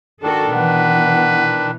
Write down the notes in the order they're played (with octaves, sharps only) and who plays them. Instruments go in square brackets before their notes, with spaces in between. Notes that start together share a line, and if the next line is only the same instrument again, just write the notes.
[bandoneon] D#3 D4 [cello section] F#4 A4
[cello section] B2 E3 [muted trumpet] B4 [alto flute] F#5